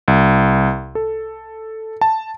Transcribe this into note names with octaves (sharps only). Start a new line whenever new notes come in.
C2
A4
A5